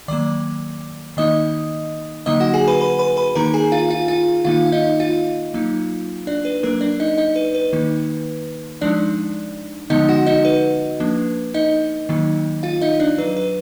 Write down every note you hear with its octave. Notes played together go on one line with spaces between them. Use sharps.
D#3 F#3 A#3 D5 D6
D#3 A#3 D#4 D#5 D#6
D3 F#3 A#3 D#4 D#5 D#6
F#4 F#5
G#4 G#5
B4 B5
B4 B5
B4 B5
B4 B5
D#3 A#3 D#4 A#4 A#5
G#4 G#5
F4 F5
F4 F5
F4 F5
D#3 A#3 D#4 F4 F5
F5
D#4 D#5
F4 F5
F#3 A#3 D#4
D4 D5
B4
F#3 A#3 D4 A#4
D4 D5
D#4 D#5
D#4 D#5
B4
B4
D#3 A#3 D#4
F3 G#3 D4 D#4 D5
D3 F3 G#3 B3 D#4 D#5
F#4 F#5
D#4 D#5
B4
F3 A#3 D4
D#4 D#5
D#3 F#3 A#3 D#4
F4 F5
D#4 D#5
D4 D5
F#3 D4 B4
B4